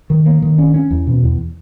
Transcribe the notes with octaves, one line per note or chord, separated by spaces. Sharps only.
D#3
A#3
D#3
C#4
C#4
E2
B2
E2